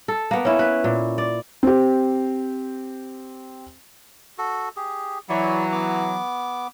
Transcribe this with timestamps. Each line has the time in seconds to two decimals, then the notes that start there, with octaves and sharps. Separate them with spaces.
0.08 A4
0.31 A#3 B3
0.45 C#4 E4
0.59 B4
0.84 A#2
1.18 D5
1.63 C4 G4
4.38 F#4 A4
4.76 G4 G#4
5.29 E3 F#3 E4 D5
5.72 B3 D6